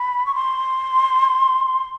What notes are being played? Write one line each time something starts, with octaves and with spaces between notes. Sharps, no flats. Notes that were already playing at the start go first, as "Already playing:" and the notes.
Already playing: B5
C#6
C6